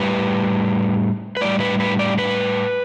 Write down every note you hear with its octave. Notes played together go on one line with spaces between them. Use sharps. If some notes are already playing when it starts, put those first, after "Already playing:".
Already playing: A2 G3 B4
B4
A2 G3 D5
B4
B4
D5
B4